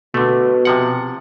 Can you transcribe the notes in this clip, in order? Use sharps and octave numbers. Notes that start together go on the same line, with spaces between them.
B2 D3 A3
C3 F3 F#5